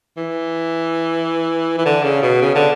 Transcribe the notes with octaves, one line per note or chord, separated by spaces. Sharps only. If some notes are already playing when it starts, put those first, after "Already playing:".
E3
E3
D3
C#3
B2
C#3
D3